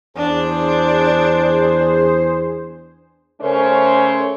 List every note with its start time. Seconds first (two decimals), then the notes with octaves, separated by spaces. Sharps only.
0.17 E2 D4 G#4 C5
3.41 C#3 A3 C#4 A#4 C5 C#5